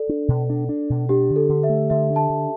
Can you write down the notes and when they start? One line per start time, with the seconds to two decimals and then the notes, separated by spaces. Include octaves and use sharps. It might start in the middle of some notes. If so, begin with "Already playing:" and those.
Already playing: A4 D5
0.09 D4
0.28 B2
0.50 D4
0.69 D4
0.90 B2
1.09 D4 G4
1.30 D3
1.36 A4
1.49 D3
1.63 E5
1.69 A3
1.90 D3 E5
2.10 D4
2.16 A5
2.30 D3